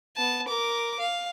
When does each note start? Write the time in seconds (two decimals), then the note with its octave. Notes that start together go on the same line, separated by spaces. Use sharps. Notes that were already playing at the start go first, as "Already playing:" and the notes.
0.17 B3 A5
0.48 A#4 D6
0.99 F5